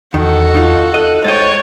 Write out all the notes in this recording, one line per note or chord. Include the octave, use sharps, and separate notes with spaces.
E2 D#3 F#4 A4 D#5
D#4 F4
A4 D#5 F#6
G#2 C5 C#5 D#5 G5 A6